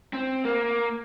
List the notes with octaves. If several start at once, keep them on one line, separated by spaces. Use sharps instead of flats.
C4
A#3